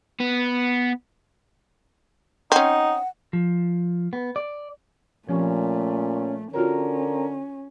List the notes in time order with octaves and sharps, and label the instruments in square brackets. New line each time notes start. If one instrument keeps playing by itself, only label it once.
[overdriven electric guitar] B3
[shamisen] C4 C#4 [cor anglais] D#4 [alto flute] F#5
[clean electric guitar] F3
B3
D5
[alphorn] A#2 [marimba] F3 C4 G4 [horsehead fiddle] A3 [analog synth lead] C#4
[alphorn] D3 [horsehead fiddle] C#4 [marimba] F4 F#4 C#5 [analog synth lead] A#4